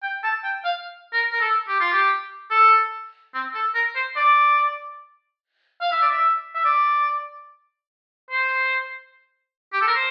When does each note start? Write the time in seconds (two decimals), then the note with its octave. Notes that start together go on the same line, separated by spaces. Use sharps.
0.03 G5
0.24 A5
0.44 G5
0.65 F5
1.13 A#4
1.33 A#4
1.41 A4
1.68 G4
1.80 F4
1.92 G4
2.51 A4
3.34 C4
3.54 A4
3.74 A#4
3.96 C5
4.16 D5
5.81 F5
5.92 E5
6.02 D5
6.11 E5
6.55 E5
6.65 D5
8.30 C5
9.73 G4
9.81 A4
9.87 A#4
9.95 C5